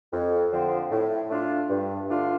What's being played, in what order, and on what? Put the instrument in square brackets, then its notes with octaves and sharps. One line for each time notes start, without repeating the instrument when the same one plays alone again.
[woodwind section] F2
D3 F3 C4
A2
A3 D4 F4
G2
D3 A3 D4 F4